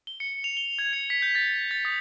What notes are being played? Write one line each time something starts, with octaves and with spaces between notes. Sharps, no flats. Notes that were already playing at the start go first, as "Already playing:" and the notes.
G7
C#7
F7
G7
G#6
C#7
B6
G6
A6
A6
D#6